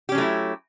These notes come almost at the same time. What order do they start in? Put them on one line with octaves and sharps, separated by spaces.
G4 C#4 F#3 A3 E4